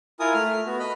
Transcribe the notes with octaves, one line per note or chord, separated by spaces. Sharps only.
E4 F4 A#4 G#5 D#6
A3 F6
B3 F#4
D#5 B5